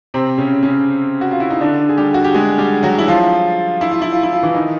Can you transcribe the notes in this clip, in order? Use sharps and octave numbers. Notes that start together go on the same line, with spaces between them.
C3 C4
C#3 C#4
C#3 C#4
F#4
F4
E4
D#4
D3 D4
G#4
G3 G4
F#4
G4
G#3 G#4
G3 G4
F#3 F#4
E4
F3 F4
E4
F4
E4
F4
E4
F4
E3 E4
D#3 D#4